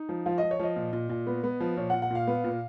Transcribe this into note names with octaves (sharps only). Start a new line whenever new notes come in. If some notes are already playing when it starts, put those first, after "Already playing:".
Already playing: D#4
F3
F3 F4
F3 D#5
C#5
F3 D#5
A#2
A#2
A#2
B3
B3
F3
A#2 C#5
F#5
A#2
F#5
A#2 F5
B3
A#2